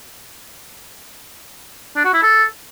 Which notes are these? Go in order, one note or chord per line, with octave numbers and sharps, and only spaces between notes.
D4
F#4
E4
A4